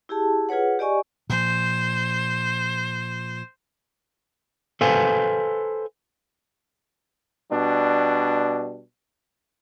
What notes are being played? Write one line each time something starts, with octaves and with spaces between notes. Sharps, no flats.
E4 G4 G#4 A5
F4 G#4 B4 C#5 F#5
G4 D5 D#5 G#5 C#6
A#2 F3 C5
A4 B4 C5 F5 G#5
B2 G3 D4